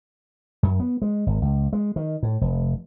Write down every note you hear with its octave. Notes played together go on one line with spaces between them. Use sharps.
F#2
B3
G#3
G#1
C#2
G#3
D#3
A2
F1